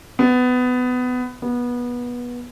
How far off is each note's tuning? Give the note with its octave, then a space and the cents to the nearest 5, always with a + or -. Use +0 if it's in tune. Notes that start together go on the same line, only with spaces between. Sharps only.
B3 +20
B3 -20